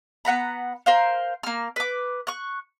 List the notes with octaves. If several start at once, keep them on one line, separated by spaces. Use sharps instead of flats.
B3 F#5 A#5 B5
A#4 C5 F5
A#3 F6
B4 D6
C#6 F#6